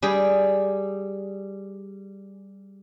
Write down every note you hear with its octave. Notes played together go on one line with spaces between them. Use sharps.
G3 G#4 G5